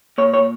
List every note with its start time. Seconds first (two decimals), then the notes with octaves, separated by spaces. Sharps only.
0.18 A#2 C#5
0.34 C#5